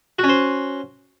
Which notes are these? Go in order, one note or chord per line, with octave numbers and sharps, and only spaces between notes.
C#4 F#4 C5